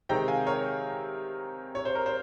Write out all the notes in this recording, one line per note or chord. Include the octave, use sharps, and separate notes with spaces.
C3 D#3 G#3 C4 D#4 G5 A#5
F5 G#5
A#4 C#5
C#5
C5
A#4
C5